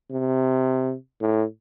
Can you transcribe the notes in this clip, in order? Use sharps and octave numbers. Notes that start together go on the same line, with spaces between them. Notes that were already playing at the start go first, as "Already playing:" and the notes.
C3
A2